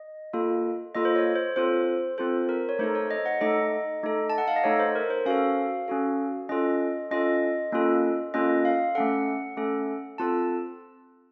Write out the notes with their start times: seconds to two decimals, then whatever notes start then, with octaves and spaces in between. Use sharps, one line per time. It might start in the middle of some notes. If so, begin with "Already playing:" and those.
Already playing: D#5
0.33 A#3 F4 A4
0.95 A#3 F4 A4 D#5
1.05 C5
1.16 C#5
1.36 C5
1.56 C4 F4 A4 C5
2.18 C4 F4 A4 C5
2.49 A#4
2.69 C#5
2.79 A3 D#4 A4 C5
2.95 C#5
3.11 D#5
3.26 F#5
3.41 A3 D#4 A4 D#5
4.03 A3 D#4 A4
4.30 A5
4.38 F#5
4.48 F5
4.56 D#5
4.64 A3 D#4 A4 C#5
4.80 C5
4.95 A#4
5.10 C5
5.26 C#4 F#4 A4 F5
5.88 C#4 F#4 A4
6.49 C#4 F4 A4 D#5
7.11 C#4 F4 A4 D#5
7.72 A#3 C#4 F4 A4
8.34 A#3 C#4 F4 A4 D#5
8.65 F5
8.95 A3 C#4 A4 F#5
9.57 A3 C#4 A4
10.18 C4 F4 A4 A5